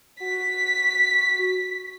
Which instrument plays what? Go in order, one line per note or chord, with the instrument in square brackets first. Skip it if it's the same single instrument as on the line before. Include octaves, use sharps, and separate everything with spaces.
[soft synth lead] F#4 [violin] B6